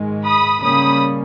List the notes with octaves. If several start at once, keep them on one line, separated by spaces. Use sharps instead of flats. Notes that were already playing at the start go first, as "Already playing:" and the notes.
Already playing: G#2 D#3 G#3
B5 D#6
C#3 G3 A#3 C#4 B5 D#6